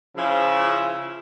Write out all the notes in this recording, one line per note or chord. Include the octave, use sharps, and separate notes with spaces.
C#3 F3 E4